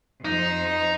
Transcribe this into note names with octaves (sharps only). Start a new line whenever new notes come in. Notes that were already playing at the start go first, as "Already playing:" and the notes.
F2 D#4 C5